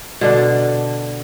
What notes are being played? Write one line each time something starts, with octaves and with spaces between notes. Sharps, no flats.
B2 D3 D4